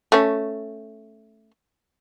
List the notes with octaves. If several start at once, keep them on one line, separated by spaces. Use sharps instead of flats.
A3 C#4